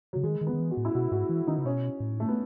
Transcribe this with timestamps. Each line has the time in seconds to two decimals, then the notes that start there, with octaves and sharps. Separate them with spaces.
0.13 C#3 F#3
0.23 D#3 G#3
0.41 D#3
0.47 B3
0.53 D#3
0.59 E3
0.71 F#4
0.77 A2
0.85 E4
0.95 B2 F#4
1.12 G#2 F#4
1.29 E3
1.47 D#3 D#4
1.58 C#3
1.65 B2 C#4
2.00 A2
2.20 A3
2.28 B3